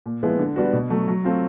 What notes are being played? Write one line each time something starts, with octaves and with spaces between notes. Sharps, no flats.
A#2
F3 G#3 B3 E4
D3
G3 B3 D4 F#4
B2
F#3 A3
F#3
A3 C4 F4